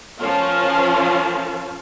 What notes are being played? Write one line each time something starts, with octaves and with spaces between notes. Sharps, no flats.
F3 C#4 F4 A#4 F5 A5